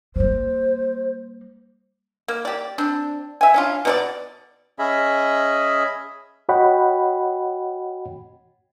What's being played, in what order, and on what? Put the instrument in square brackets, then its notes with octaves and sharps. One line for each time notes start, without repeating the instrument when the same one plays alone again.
[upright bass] G3 A#3 [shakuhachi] C5
[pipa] A#3
G4 D5
C4 D4
E5 G#5
C#4 D4 F4
B2 D4 D5
[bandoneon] C#4 G#4 D#5 E5 B5
[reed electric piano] F#4 C#5 D#5 F#5 G5 B5